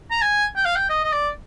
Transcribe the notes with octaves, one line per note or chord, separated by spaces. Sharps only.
A#5
G#5
G5
F5
G5
D#5
D#5
D5